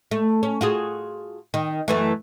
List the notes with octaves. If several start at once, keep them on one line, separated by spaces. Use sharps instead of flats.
A3
C#4
F4 F#4 G#4
D#3
F#2 E3 A3